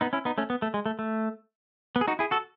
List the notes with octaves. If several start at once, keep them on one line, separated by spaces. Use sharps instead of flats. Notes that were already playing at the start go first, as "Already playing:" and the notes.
B3 D#4
C#4 E4
B3 D#4
A3 C#4
B3
A3
G#3
A3
A3
B3
G#4
D#4 F#4
E4 G#4
F#4 A4